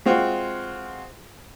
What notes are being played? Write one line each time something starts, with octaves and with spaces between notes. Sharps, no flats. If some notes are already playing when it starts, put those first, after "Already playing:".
G#3 C4 F4 F#4